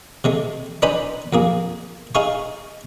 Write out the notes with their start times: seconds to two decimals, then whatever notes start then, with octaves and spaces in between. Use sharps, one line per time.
0.24 C3 G#3 A3
0.82 D4 D#4 B4 C5 G#5 B5
1.33 F2 A#3 G#4
2.15 D#4 G#4 F5 G#5 C#6